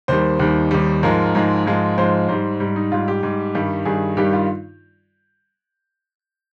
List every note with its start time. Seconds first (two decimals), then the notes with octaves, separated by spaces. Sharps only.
0.08 D#2 D#3 G3 C5
0.39 D#2 D#3 G3
0.71 D#2 D#3 G3
1.03 G#2 F3 G#3 A#4
1.35 G#2 F3 G#3
1.66 G#2 F3 G#3
1.98 G#2 F3 G#3 C5
2.29 G#2 G3 C5
2.60 G#2 G3
2.76 D#4
2.92 G#2 G3 F4
3.08 G4
3.23 G#2 G3
3.55 G2 D#3 G3
3.85 G2 D#3 G3 G#4
4.17 G2 D#3 G3 G4
4.33 F4